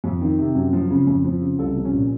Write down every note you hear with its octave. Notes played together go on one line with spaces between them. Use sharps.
F2
D#3
C3
F#2
F3
C#3
F2
F3
C#3
C2 A4
F3
C#4
A#2